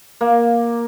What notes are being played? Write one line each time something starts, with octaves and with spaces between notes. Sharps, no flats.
A#3